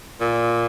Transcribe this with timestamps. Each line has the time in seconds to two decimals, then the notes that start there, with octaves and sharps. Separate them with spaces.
0.20 A#2